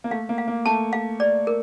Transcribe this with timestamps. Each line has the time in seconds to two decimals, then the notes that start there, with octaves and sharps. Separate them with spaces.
0.04 A#3
0.11 A3 F5
0.29 A#3
0.38 F5
0.48 A#3
0.65 A3 A5
0.93 F5
1.20 D5
1.47 A#4